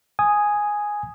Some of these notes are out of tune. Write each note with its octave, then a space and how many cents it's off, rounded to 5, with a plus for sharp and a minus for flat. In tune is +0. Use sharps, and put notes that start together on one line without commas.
G#5 +0 D#6 +0